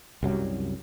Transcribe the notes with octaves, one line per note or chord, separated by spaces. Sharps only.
C2 F#2 F#3 G3